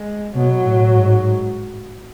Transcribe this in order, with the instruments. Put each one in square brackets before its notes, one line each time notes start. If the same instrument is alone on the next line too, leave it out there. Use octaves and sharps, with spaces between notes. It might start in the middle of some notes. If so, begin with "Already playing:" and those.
Already playing: [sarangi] G#3
[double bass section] B2 [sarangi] F#3
[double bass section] A2
G#2